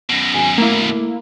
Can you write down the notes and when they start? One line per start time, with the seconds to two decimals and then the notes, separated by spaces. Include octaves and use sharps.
0.10 F#2 B2 A#6
0.34 G#1 G#5
0.58 A3 A#3 E4